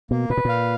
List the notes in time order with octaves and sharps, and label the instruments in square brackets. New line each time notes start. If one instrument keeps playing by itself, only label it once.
[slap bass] B2 [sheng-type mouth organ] A#3
[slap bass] A#2 [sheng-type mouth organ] B4
[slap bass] B2
[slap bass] A#2 [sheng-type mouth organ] F5